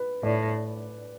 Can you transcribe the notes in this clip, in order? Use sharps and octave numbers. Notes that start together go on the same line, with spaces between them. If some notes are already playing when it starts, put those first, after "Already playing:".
Already playing: B4
A2 D5